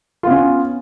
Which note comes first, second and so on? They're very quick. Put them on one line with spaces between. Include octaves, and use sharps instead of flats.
F4 B3 C#4